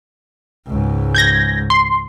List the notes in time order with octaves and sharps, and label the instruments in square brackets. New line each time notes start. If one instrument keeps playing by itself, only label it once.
[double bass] C#2 G#2
[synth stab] G6 G#6 A#6
C6